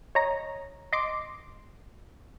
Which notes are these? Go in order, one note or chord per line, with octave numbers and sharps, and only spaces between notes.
C#5 D#5 A#5
D#5 C6 D6